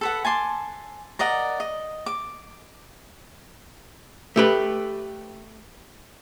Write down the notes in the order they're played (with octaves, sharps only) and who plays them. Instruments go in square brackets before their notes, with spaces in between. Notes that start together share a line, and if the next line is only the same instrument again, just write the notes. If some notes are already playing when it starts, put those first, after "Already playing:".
[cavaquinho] A4 B4 F#5
G#5 A5 C6 D6
A#4 D5 D#5 F#5
D#5
D6
[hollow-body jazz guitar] A3 G4 B4